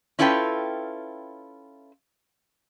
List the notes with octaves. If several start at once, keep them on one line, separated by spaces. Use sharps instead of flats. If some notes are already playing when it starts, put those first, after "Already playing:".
C#4 E4 F4 A4 B4 G5